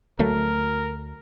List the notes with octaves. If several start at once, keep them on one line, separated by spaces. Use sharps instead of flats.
D2 F#3 A3 A#4